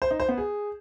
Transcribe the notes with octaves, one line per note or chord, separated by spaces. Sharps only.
C5
D#4
C5
B3
G#4